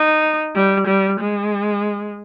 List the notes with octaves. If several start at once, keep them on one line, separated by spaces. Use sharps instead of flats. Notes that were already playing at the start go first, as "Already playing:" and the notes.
Already playing: D#4
G3
G3
G#3